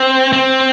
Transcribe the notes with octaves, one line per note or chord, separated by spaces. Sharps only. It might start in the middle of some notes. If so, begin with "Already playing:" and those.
Already playing: C4
C4